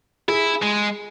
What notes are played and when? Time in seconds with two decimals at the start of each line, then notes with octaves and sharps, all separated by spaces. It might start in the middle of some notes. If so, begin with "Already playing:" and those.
0.28 E4 G#4
0.63 G#3